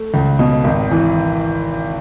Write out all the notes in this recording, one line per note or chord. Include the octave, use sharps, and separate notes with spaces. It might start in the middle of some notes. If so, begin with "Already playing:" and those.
Already playing: A3
C#2
B2
G#1
E3